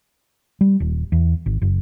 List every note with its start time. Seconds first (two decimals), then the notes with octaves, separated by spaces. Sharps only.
0.61 G3
0.80 D#1
1.12 E2
1.46 G#1
1.62 F#1